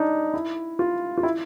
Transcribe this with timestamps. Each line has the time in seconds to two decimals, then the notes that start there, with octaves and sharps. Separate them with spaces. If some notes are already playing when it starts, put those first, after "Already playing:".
Already playing: D4 D#4
0.34 E4
0.79 F4
1.18 F4
1.23 E4